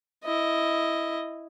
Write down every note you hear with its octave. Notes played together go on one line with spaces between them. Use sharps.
E4 D#5